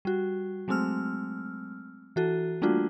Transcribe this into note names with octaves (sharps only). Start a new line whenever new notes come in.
G3 F#4
F#3 G#3 A3 C4 E6 F6
E3 F#4 A4
G3 A3 A#3 D4 F4 F#4